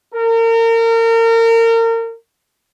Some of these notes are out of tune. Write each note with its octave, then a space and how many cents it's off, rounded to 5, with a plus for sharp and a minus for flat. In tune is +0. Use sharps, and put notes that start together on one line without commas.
A#4 -30